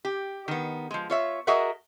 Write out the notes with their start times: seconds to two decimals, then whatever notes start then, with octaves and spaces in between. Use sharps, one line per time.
0.05 G4
0.48 D#3 B3
0.91 F3 G#3
1.10 F4 C#5 E5
1.47 F#4 G#4 A#4 D#5 E5 F#5